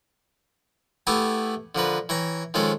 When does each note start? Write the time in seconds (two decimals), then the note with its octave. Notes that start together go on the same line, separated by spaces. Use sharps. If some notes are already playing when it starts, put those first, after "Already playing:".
1.07 A3 B3 E4 G4 G#5 A5
1.75 D3 F3 A#4 B4
2.09 E3 C#5 G5 A#5
2.54 D#3 F3 G#3 C#4 A4 C#5